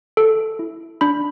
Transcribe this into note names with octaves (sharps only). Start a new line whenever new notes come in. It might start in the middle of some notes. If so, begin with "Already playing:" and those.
A4
E4
D4 B5